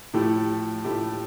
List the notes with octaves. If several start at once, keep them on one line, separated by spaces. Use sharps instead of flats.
A2 F3 A3 E4 G4
A2 F3 A3 E4 G4